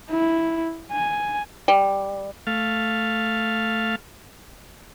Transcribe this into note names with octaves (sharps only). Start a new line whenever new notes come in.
E4
G#5
G3
A3 F5